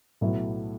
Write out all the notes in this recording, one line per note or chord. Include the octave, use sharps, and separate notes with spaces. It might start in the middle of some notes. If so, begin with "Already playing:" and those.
B1 A2 F#3 B3 E4